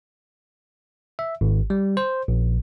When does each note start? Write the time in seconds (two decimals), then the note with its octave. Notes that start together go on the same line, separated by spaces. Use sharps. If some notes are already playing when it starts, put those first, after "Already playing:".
1.19 E5
1.41 G#1
1.70 G3
1.97 C5
2.28 A#1